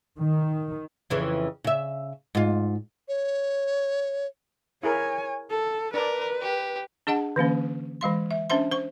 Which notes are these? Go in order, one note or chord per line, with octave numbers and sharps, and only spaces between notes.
D#3
F2 C#3 E3
C#3 E5
G#2 F4
C#5
E4 G#4 A#4 C#5 G#5
A4
D4 A#4 B4 D5
G4
D4 G#4 D#5 F#5 A5
D3 E3 A#3 C#4
E3 G#3 F5 C6
E5
C#4 D4 C5 E5 C6
C5 C#6